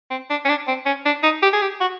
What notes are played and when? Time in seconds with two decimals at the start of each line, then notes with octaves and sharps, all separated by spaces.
0.10 C4
0.30 D4
0.45 C#4
0.49 D4
0.67 C4
0.86 C#4
1.05 D4
1.23 D#4
1.42 G4
1.53 G#4
1.61 G4
1.80 F#4